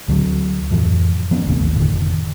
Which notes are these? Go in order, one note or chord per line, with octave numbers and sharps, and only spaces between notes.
D2 D3 F3 F#3
F2 A2 E3 F3
F3 B3 C#4
A1 D#2 A2 C3
F1 A2 D3 D#3